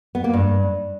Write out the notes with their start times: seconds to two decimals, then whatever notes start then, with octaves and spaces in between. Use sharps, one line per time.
0.15 B3
0.24 A#3
0.33 G2